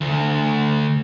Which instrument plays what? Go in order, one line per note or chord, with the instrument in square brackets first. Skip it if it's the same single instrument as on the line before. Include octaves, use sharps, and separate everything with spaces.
[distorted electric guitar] D2